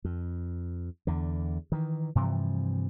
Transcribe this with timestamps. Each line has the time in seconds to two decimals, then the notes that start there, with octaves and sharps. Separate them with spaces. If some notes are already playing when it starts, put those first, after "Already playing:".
0.05 F2
1.07 E2 D3
1.72 D#3 E3
2.15 G2 C3 E3 F3